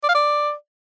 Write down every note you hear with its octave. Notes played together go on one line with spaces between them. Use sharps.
D5
F5
D5